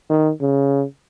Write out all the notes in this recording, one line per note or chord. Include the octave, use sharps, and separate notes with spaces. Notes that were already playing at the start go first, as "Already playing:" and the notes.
D#3
C#3